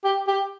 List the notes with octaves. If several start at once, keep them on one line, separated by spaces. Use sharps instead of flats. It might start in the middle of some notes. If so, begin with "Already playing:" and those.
G4
G4